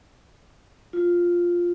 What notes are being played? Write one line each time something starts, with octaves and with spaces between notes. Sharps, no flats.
F4